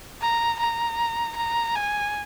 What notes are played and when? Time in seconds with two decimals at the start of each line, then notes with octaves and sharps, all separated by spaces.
0.22 A#5
0.60 A#5
1.36 A#5
1.76 G#5